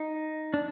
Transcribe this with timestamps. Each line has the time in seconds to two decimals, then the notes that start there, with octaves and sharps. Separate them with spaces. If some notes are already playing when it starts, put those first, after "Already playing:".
Already playing: D#4
0.54 D4